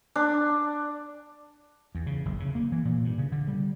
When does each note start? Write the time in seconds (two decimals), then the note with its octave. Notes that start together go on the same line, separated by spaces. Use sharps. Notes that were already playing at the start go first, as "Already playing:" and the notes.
0.16 D4
1.95 E2
2.07 C#3
2.25 F#1
2.40 C#3
2.55 A#3
2.72 E3
2.85 A#2
3.04 G2
3.18 C#3
3.32 D3
3.48 G3